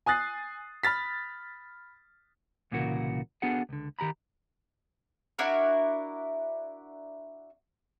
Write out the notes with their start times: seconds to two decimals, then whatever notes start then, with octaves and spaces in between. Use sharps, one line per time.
0.06 G#5 D#6 F#6 A6 C7
0.83 B5 F6 A6 B6
2.72 C2 A#2 C#3 E3 F#4 A#4
3.42 B3 D4 F#4 G#4 A4 F#5
3.69 C#2 D3
3.99 D#3 G4 A#5 B5
5.39 D4 E4 F#4 A#4